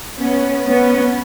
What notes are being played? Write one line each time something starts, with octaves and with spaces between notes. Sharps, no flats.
B3 C#4
B3 C#4